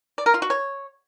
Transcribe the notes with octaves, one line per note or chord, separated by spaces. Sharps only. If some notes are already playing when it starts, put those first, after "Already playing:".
D5
A#4
F4
F#4
C#5